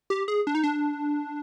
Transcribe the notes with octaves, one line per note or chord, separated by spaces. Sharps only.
G4
G#4
D4
D#4
D4